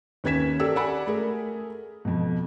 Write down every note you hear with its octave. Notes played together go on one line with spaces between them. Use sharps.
D#2 C#4 B4 G#6 B6 E7
G4 A4 A#4 D5 E6
D5 F#5 G#5 B5
A3 G#4 A#4
F2 B2